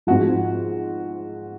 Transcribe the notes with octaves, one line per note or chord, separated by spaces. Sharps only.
G#2 F3 F#4